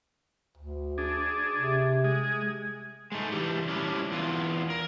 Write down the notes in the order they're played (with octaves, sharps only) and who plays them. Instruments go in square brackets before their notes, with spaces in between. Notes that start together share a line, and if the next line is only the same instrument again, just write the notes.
[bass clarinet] D2
[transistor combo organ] D4 G#4
[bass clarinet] C3
[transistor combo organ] G#3 G#4
[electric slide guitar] G#3 A3 D#4
E3 G3 G4
G3 C#4 D4 E4
E2 E3 F4
A#4